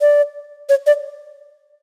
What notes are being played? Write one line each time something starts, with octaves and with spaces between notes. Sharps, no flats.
D5
C#5
D5